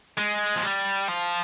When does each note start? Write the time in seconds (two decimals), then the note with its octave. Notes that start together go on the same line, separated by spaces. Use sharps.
0.19 G#3
0.56 F3
0.64 G3
1.09 F3